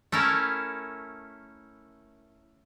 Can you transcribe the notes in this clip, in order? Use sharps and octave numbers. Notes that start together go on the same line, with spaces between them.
A3 C#4 E4 A4 A#4